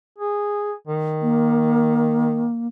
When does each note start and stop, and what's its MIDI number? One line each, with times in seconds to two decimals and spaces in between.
0.18 0.72 68
0.87 2.47 51
1.22 2.67 58